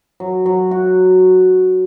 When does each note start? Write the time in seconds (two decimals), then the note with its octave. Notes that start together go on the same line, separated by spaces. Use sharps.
0.20 F#3
0.46 F#3
0.71 F#4